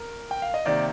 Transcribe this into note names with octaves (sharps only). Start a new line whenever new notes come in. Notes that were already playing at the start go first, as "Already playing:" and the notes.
Already playing: A#4
G5
F5
D#5
C3 D#3 A#3 D5